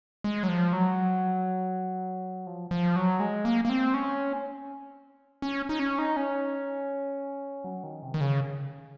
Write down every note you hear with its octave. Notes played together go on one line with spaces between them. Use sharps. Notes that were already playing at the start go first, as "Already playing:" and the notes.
G#3
F#3
F3
F#3
F3
F3
F#3
G#3
A#3
A#3
C4
C#4
C#4
D#4
C#4
D#4
C#4
F#3
D#3
C3
D#3
C#3